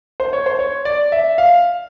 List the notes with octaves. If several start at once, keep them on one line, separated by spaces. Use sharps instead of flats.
C5
C#5
C5
C#5
D5
E5
F5